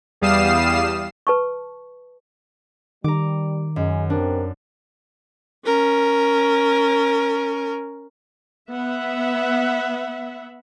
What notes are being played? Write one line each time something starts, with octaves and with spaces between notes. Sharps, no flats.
E2 G3 F5 D#6 C7 E7
B4 A5 C#6
D#3 G3 A#5 D6
F#2 G#3
C3 C4 D4 A#4
C#4 A#4
B3 E5 F#5